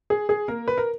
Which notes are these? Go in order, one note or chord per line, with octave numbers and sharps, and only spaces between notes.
G#4
G#4
A#3 A#4
B4
A#4